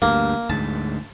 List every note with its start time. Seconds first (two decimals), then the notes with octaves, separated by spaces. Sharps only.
0.02 D2 G2 A#3
0.50 D2 G#2 A5